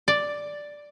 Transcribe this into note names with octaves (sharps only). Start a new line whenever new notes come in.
D5